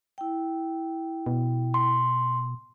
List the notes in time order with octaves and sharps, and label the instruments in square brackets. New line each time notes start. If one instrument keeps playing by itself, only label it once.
[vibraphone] E4 G5
[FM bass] B2
[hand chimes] C6